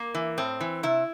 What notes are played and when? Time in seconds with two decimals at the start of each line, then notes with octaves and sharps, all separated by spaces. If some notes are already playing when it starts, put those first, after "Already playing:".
Already playing: A#3
0.14 E3
0.38 A2 C4
0.60 E3
0.83 C3 E4